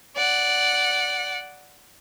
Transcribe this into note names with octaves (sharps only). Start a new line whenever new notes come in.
D5 F#5